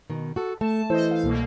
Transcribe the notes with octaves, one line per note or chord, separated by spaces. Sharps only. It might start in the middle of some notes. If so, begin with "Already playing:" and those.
B2 D#3
F#4 A4
A3 A5
E3 A4 C5 D#5
F5
C2 B2 A#3